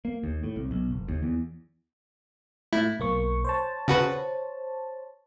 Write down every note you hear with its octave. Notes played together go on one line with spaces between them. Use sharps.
A#3
D#2
A2
C2
B1
F#1
D#2
E2
A2 E4
B1 A#3 C#6
C5 C#5 A5
C#3 F#4 B4